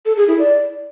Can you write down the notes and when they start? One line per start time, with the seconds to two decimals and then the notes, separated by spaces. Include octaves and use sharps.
0.06 A4
0.17 G#4
0.28 E4
0.39 D5